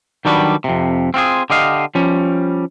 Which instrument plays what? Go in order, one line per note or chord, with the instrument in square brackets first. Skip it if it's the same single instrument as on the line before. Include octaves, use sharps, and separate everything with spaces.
[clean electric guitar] D#3 F#3 G3 D4 F#4 B4
F2 C3
C4 F4 F#4 G#4
D3 G4 D#5 F5
F3 G3 C#4